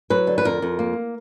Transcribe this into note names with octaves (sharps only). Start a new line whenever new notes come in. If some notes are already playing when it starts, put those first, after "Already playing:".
F#3 B4
D3
B4
F2 A#4
F2
A#3